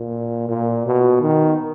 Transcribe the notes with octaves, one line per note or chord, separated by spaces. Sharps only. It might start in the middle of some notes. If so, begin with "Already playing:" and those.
Already playing: A#2
A#2
B2
D#3